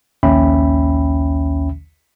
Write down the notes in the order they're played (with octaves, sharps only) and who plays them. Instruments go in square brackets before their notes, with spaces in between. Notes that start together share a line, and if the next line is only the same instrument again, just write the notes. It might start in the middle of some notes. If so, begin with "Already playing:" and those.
[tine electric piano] A#1 D#2 C#4 E5 G5 B5